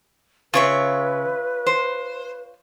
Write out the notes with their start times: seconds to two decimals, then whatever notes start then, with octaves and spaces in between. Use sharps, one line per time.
0.54 C#3 F4 B4 C#5 E5
1.66 C5